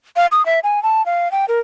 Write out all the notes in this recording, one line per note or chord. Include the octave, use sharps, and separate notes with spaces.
F5
D#6
E5
G#5
A5
F5
G5
A#4